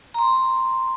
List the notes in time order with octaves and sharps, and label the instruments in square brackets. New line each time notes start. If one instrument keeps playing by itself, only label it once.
[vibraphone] A#5 C6